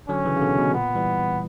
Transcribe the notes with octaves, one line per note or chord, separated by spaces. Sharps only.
D3 F#3 C#4
C#3 E3
C#3
B2 D3
B2
A#2 B3
E3 G3